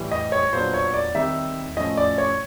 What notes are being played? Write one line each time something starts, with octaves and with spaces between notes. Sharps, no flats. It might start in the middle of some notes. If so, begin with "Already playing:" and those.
Already playing: A2 E3 G3
D#5
C#5
A#2 F#3 B3 D4 C5
C#5
D5
D#3 G3 C4 D#4 E5
A2 F3 A3 C#4 D#5
D5
C#5